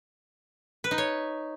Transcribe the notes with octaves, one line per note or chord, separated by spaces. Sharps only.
B4
D#4
C#5